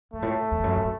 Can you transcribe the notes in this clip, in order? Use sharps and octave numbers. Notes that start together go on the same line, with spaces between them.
F#2 A3
A2
E2
F#2
A2